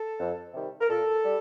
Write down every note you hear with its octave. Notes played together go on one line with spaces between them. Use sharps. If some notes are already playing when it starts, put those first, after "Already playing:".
Already playing: A4
F2
C3 D#3 G3
A#4
A#2 A4
G3